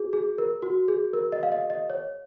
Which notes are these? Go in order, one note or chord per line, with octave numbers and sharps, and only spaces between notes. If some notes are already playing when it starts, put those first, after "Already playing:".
Already playing: F#4 G#4
G#4
A#4
F#4
G#4
A#4
D#5
F5
D#5
D#5
C#5